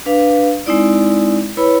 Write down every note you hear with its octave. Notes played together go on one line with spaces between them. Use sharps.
D4 B4 F5
G#3 C4 D#4 E4 D5
E4 B4 C#5 B5